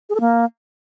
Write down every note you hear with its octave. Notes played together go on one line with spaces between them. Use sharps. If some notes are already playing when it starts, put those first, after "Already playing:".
G#4
A4
A#3